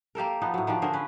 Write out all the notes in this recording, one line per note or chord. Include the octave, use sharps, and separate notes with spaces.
A#3 G4 A4 A#4
F3 B3 D#4
A2 F#3
D#3 F3 D4 G4
D3 G#4 A#4 C5
C#4 B4